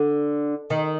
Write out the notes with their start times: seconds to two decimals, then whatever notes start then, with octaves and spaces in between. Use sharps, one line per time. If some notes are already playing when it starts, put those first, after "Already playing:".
Already playing: D3
0.70 D#3